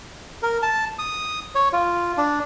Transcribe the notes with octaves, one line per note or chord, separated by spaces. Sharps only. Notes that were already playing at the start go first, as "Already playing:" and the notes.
A#4
A5
D#6
C#5
F4
D4